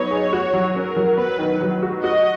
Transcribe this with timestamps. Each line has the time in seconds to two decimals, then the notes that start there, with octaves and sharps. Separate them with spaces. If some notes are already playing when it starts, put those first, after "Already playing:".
Already playing: F#3 B3 D#4 C#5
0.11 G#4
0.33 F#4
0.54 F#3
0.75 C#4 A#4
0.97 F#3
1.17 B3 B4
1.39 D#3
1.61 F#3
1.83 F#4
2.03 F#4 D#5